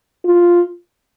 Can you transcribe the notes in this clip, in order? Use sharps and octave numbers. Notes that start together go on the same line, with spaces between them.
F4